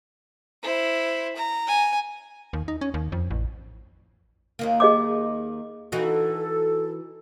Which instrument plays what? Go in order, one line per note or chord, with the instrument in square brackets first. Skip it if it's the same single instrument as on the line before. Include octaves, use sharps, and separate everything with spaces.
[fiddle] E4 C5
A#5
[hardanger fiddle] G#5
[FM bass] D#2
D#4
C#4
D#2
F2
A1
[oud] D#2 D#3 A#3
[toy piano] G#4 D#5 D6
[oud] E3 D#4 F#4 [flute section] A4